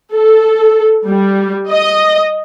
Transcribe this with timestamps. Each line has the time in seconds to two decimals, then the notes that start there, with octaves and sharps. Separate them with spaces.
0.14 A4
1.06 G3
1.70 D#5